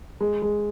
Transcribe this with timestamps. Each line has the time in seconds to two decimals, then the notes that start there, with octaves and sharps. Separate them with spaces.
0.21 G#3
0.42 G#3